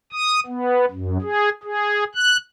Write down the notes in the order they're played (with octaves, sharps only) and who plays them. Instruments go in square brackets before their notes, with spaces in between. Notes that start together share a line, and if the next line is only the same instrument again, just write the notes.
[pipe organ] D#6
B3
F#2
G#4
G#4
F#6